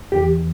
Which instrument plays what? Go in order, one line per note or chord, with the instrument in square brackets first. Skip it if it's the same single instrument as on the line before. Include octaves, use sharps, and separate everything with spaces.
[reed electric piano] E2 E3 G4